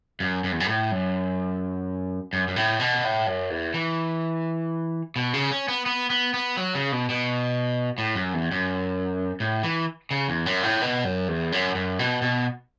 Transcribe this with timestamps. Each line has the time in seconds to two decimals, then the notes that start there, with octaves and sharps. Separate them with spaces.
0.20 F#2
0.44 F#2
0.52 E2
0.60 F#2
0.68 A2
0.91 F#2
2.33 F#2
2.48 F#2
2.56 A2
2.80 B2
3.04 A2
3.27 F#2
3.50 E2
3.74 E3
5.16 B2
5.34 C#3
5.51 C#4
5.68 B3
5.86 B3
6.10 B3
6.34 B3
6.57 F#3
6.75 C#3
6.92 B2
7.09 B2
7.98 A2
8.15 F#2
8.33 E2
8.52 F#2
9.40 A2
9.63 E3
10.11 C#3
10.29 E2
10.46 F#2
10.63 A2
10.81 B2
11.04 F#2
11.28 E2
11.52 F#2
11.75 F#2
11.99 B2
12.22 B2